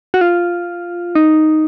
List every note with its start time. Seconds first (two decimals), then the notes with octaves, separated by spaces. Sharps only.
0.14 F#4
0.21 F4
1.15 D#4